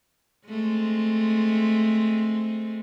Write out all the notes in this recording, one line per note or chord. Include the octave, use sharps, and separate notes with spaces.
G#3 A3 C4